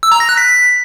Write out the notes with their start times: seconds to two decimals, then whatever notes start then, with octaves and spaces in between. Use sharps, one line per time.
0.03 E6
0.12 A#5
0.20 A#6
0.29 F#6
0.37 B6